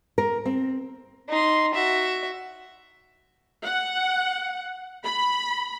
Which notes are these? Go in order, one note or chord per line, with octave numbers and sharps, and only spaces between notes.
A#4
C4
D#4 C6
F#4 E5
F#5
B5